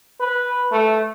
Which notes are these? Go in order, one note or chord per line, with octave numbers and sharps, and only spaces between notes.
B4
A3